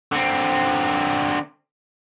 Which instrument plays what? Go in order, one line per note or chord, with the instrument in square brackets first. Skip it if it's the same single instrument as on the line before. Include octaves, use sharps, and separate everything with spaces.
[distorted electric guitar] D3 C4